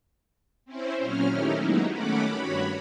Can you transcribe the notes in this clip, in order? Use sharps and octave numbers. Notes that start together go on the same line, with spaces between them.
C4 C#4 E4 C5
A#2 F#3 C#4 F6
D#3 A3 C#4 D#4 E4 G4
F#3 G#3 A#3 B3 D#4 E4
D#3 A3 C#4 F#5 B5 D6
G2 F#4 C#5 B5